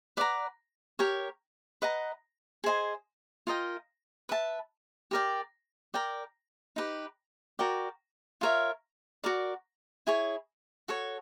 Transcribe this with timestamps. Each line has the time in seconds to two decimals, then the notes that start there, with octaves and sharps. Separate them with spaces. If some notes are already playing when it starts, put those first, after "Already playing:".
0.17 B4 D5 F#5 A#5
0.99 G4 A#4 C#5
1.82 B4 D#5 F#5 A#5
2.64 G#4 C5 D#5 G#5
3.47 F4 A#4 D#5 G5
4.29 B4 E5 A5
5.11 G4 A#4 D5 G5
5.94 A#4 D5 G5
6.76 D#4 G4 B4
7.59 F#4 A#4 D5 G5
8.41 F4 A#4 C#5 E5
9.24 F#4 A#4 D5
10.07 E4 G#4 C#5
10.88 F#4 A4 C#5